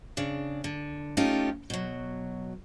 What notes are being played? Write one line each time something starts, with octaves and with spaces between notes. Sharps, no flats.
C#3 D4
D3
A3 C#4 D#4 F4 G4
B2 F#3